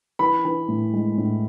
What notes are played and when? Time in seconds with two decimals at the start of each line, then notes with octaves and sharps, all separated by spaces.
0.19 E3 B5
0.45 E3
0.68 A2
0.93 G#3
1.18 A2